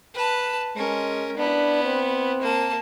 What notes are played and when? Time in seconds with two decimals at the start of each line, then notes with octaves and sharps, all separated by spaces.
0.14 B4 A5
0.77 G#3 C#4 A#4
1.37 B3 D4 E4
1.84 C4
2.41 A#3 A5